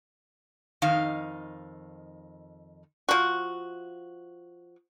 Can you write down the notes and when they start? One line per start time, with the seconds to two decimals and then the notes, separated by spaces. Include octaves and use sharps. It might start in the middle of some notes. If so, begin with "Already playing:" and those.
0.82 F2 D#3 D#4 F5
3.09 F3 F#4